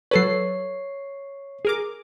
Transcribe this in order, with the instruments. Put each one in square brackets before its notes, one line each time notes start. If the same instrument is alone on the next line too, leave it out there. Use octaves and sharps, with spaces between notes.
[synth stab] F#3 A4 B4 [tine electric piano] C#5 C7
[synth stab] G#4 A#4 D6